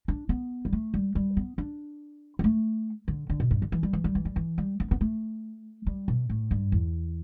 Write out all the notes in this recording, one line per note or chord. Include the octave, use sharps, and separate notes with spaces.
D4
B3
G3
A3
G3
G3
B3
D4
B3
A3
D3
D3
B2
G2
D3
E3
G3
E3
G3
E3
G3
E3
G3
B3
B3
A3
G3
B2
A2
G2
E2